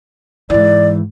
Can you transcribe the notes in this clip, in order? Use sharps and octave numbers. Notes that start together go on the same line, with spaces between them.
G#2 E3 D5